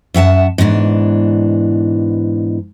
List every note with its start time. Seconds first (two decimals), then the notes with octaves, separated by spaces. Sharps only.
0.14 F#2 E5 F#5 A5
0.58 G#2 B2 E3 D4